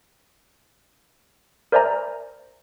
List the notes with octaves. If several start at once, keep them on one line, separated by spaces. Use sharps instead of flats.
A#4 C5 D5 E5 G#5 A#5